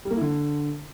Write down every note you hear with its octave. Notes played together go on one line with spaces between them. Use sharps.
G3
A#3
E4
D3